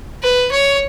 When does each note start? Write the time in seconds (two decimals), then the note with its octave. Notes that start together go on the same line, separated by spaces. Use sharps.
0.23 B4
0.52 C#5